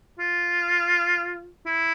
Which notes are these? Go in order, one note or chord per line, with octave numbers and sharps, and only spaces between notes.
F4
E4